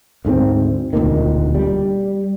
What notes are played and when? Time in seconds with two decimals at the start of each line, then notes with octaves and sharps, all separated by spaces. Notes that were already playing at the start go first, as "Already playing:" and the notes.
0.25 D2 G#2 G3 C4
0.93 E1 D2 A#2 D#3
1.54 G3